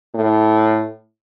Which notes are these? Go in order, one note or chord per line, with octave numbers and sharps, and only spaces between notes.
A2